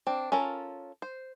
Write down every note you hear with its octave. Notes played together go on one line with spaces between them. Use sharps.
C4 D4
C#4 F4 A4 A#4
C5